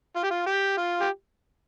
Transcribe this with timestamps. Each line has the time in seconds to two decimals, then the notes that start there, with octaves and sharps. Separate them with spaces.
0.16 F4
0.23 G4
0.31 F4
0.46 G4
0.77 F4
1.00 G4